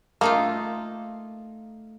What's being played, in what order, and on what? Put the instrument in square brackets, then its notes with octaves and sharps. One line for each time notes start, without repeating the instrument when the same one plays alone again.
[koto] A3 D#4 F4 [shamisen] A#3